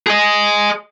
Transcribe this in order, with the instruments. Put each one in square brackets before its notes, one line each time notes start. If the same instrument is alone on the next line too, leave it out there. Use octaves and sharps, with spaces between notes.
[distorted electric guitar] G#4 D#5